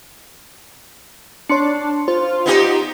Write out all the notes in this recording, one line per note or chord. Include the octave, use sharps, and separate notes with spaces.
D4 C#5 C6 C#7
F4 C5
B3 D#4 G4